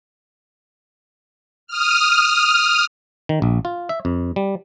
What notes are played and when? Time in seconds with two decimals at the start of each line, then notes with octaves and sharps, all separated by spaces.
1.67 D#6 F6
3.29 D#3
3.42 A#1
3.65 F4
3.89 E5
4.05 F2
4.36 G3